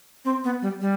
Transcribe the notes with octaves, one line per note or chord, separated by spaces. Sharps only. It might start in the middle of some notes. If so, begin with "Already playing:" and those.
C4
B3
G3
G3